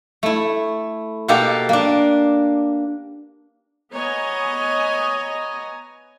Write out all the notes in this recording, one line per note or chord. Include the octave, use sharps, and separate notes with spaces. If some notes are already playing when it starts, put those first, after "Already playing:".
A3 E4
B2 A#3 G4 A4 F5 A#5
A#3 D4
B3 C#5 D#5 G#5 A#5